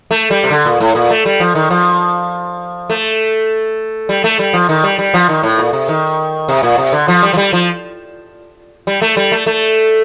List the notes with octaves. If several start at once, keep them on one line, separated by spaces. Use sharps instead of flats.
A3
G3
C3
D3
A#2
A2
A#2
A3
G3
F3
D#3
F3
A3
G3
A3
G3
F3
D#3
G3
G3
F3
D#3
A2
A#2
C3
D#3
C3
A#2
C3
D3
F3
G3
F3
G3
F3
G3
A3
G3
A3
A3